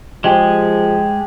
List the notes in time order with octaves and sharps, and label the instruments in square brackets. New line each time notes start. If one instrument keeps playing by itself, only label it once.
[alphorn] F3 [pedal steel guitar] G#3 [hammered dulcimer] G4 G#4